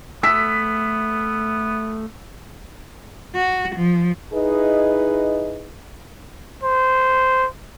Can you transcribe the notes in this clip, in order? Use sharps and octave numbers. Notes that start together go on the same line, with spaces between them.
A3 B3 E6 B6
F#4
F3
D#4 E4 G#4 B4 D#5
C5